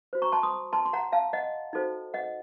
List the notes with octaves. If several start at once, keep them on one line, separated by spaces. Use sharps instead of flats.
F#4 C5
A#5 C#6
A5 C6
C6 D#6
A5 C6
C6
F#5 A#5
F5 A5
D#5 F#5
D#4 F#4 A4 C5
D#5 F#5